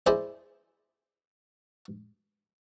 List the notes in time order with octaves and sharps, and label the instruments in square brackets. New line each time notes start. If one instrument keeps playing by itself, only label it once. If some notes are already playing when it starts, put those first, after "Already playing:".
[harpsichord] E4 G#4 C5 D5 D#5